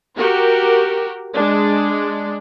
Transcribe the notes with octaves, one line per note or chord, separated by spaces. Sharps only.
F#4 G4 A#4
G#3 D4